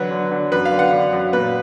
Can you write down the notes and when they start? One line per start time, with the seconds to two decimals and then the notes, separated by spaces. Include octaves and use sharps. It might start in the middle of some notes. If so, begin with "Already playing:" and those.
Already playing: D3 F#3 B4
0.11 D3
0.31 D3
0.52 F#2 B4
0.65 F5
0.72 D3
0.79 F#5
0.92 D3
1.13 F#2
1.33 A#2 B4